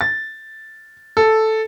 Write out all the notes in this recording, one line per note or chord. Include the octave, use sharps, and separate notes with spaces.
A6
A4